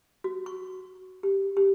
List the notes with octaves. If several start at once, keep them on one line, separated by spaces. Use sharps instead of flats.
F#4
C#6
G4
G4